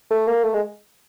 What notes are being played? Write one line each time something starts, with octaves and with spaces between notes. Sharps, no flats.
A3
A#3
A3
G#3